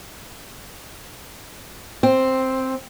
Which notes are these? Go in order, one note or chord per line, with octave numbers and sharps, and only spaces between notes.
C4